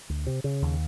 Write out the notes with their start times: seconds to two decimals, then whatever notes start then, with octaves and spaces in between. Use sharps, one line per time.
0.10 D2
0.27 C3
0.44 C#3
0.62 D#2